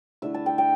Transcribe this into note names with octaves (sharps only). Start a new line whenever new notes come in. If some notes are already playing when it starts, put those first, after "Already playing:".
D3 A3 E4 E5
A5
G5
G5